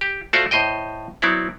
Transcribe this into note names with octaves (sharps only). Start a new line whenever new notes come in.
G4
A3 F4 F#4 C5 D5 E5
A2 C5 D#5 G5
F#3 B3 C4 E4 D5